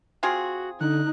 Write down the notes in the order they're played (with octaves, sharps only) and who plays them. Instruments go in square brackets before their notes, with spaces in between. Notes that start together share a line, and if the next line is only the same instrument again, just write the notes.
[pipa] C4 F4 G#4 [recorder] F#4
[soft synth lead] D3 [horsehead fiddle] D#4 [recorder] F#6